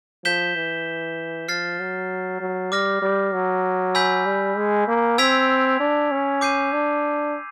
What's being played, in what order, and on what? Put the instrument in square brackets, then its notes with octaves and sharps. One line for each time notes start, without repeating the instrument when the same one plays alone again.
[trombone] F3 [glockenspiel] G6 B6 E7 G7
[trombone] E3
[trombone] F3 [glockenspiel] F6 A6 C7
[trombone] F#3
F#3
[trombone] G3 [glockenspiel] D6 F6 A#6
[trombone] G3
F#3
[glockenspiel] G#5 B5 E6 G6 B6
[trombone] G3
G#3
A#3
[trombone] C4 [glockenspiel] E6 G#6 B6 D7 F7
[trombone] D4
C#4
[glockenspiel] D6 G6 C7 D#7
[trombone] D4